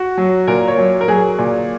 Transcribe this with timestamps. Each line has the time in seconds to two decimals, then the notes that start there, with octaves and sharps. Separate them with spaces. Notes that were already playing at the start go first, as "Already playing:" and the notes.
Already playing: F#4
0.18 F#3
0.48 A#2 A#4
0.68 C#5
0.78 F#3
1.01 A#4
1.08 F#3 G#4
1.38 A#2